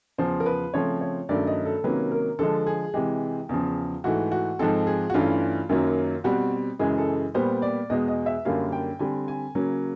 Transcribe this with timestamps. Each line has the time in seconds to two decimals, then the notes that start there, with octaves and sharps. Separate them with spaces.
0.18 E2 C#3 F3 C5
0.40 A#4
0.46 B4
0.74 C#3 F3 A3 C4 C#5
1.01 C#5
1.29 G2 D#3 F#3 A3 C#4 D5
1.47 D#5
1.65 A4
1.84 C3 D#3 F#3 A#3 C#4 B4
2.11 A#4
2.39 D3 F3 G#3 A4
2.67 G#4
2.94 C3 E3 G#3 G4
3.49 E2 C#3 F3
4.04 G#2 E3 A3 F#4
4.32 F#4
4.59 G#2 F3 G#3 C4 A4
4.87 G#4
5.10 F#4
5.14 G2 E3 A3 C#4 F4
5.69 F#2 D#3 F#3 A#3 C#4
6.24 B2 G3 C4 F#4
6.79 F#2 C#3 E3 G#3 G#4
6.98 A4
7.34 A#2 G3 B3 C5
7.62 D5
7.90 E2 B2 G#3 D#5
8.08 D#5
8.26 E5
8.45 F#2 D3 G3 A#3 C#4 F5
8.72 G5
8.99 D3 G3 C4 G#5
9.28 G#5
9.55 C#3 F#3 A#3 C#4